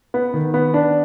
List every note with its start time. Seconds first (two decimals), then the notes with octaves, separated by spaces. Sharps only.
0.14 B3
0.34 D#3
0.54 B3
0.74 D4